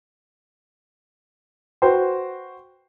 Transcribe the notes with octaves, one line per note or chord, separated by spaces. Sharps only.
F#4 B4 C5 G5 C6